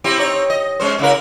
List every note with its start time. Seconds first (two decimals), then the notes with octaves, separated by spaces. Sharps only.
0.04 C4 E4 G4
0.18 C4 D#4 C#5
0.50 D#5
0.80 G#3 C#4 C5
0.99 C#3 E4 A#4